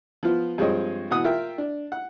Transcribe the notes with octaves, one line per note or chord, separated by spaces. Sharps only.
F3 B3 F4
G2 F3 G#3 C4 C#5 D#5
B2 E3 F#5 D#6
F4 A#4 E5 G5
D4
F#5